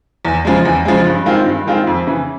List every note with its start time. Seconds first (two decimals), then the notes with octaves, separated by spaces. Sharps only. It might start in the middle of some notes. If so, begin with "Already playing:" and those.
0.25 E2
0.45 C#3 F3 G#3
0.65 E2
0.85 C#3 F3 G#3
1.06 G2
1.26 D#3 G#3 C4 F4
1.46 G2
1.67 D#3 G#3 C4 F4
1.87 F2
2.07 C#3 E3